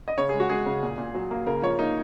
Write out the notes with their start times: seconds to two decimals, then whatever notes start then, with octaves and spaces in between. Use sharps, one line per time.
0.08 D#5
0.18 C#3 C#5
0.29 G#3 G#4
0.40 F#4
0.49 G#3 G#4
0.66 C#3
0.83 A#2
0.98 A#2
1.15 F#3
1.31 A#3
1.46 C#3 A#4
1.62 F3 C#5
1.79 A#3 D#4